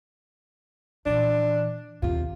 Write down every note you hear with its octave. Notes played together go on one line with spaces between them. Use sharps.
A#2 E3 D4
D#2 C3 F4